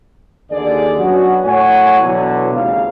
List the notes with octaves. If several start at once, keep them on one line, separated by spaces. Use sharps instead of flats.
D#2 D3 G#4 D5
F#2 F#3 B3 C#4 D4 F#4
A2 C#5 F#5 G#5
B2 D3 E3 F#3
G#1 D#2 G#2 C#3 E3 F5